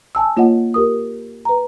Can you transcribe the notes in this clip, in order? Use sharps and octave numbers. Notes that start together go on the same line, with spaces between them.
G#5 A5 E6
A#3 F4 C#5 D#5 F#5
G4 A#4 D#6
B4 A#5